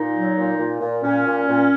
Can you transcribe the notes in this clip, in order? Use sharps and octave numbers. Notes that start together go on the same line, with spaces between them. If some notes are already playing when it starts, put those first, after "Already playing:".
Already playing: A#2 D#4
F#3
A#2
A#2
A#2
A#2 C#4
A#2
A#2